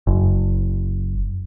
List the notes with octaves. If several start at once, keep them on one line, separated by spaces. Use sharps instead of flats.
F#1